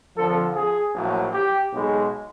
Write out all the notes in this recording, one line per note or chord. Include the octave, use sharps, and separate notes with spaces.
F2 D3 F3 A4
G#4
A#1 A2 F#3
G4
B1 B2 G#3